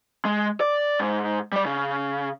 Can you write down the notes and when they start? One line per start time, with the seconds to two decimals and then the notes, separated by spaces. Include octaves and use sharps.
0.25 G#3
0.60 D5
1.00 G#2
1.52 G3 D5
1.66 C#3